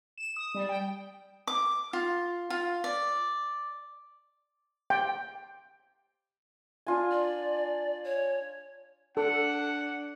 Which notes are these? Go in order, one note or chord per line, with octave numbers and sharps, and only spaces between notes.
E7
D#6
G3
G5
D6
F4
F4
D5
G5
D4 F4 G#5
D5
C#5
D4 A4 F#5